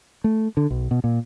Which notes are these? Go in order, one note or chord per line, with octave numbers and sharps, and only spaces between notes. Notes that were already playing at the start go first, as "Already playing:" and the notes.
A3
D3
B1
B2
A#2